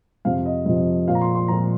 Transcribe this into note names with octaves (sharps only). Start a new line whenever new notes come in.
F2 C3 F3 F5
D#5
F2 C3 F3 D#5
A#2 F3 F5
A#5
C6
C6
A#2 F3 A#5